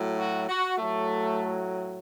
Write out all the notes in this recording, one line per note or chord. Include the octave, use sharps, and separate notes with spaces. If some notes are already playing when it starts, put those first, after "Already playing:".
Already playing: A2 F#3
F#4
F#4
A2 F#3 A3